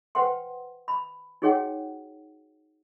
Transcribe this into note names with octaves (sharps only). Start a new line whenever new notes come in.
B4 C5 F#5 G5 C6
B5
D#4 F#4 G#4 C#5 F#5 G5